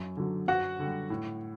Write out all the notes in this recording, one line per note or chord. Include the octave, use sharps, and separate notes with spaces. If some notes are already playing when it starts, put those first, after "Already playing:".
Already playing: F#2
D3 F#3
F#2 F#4 F#5
D3 G3
A2